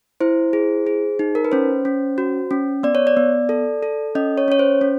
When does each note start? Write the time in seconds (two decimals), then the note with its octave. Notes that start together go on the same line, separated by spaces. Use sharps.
0.20 E4 C5
0.53 G#4
0.87 G#4
1.19 D#4
1.35 A#4
1.45 B4
1.52 C#4 C5
1.85 C#4
2.18 F#4
2.51 C#4
2.83 B3 D5
2.95 C#5
3.07 D5
3.17 B3
3.49 A4
3.83 A4
4.15 C#4 D#5
4.37 C#5
4.48 C#4 C#5
4.59 C5
4.81 C#4